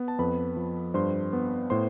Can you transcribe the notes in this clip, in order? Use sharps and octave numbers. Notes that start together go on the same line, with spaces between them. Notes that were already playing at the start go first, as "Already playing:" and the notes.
Already playing: B3
A5
F2 B4 B5
F3
G2 C5 C6
B3
A2 C5 C6